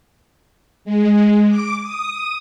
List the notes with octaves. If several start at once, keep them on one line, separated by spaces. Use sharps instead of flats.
G#3
D6
D#6